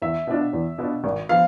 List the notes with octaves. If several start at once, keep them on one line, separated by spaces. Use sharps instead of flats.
E2 E5
B2 B3 D4 F4
E2
B2 B3 D4 F4
G#1
F3 B3 F5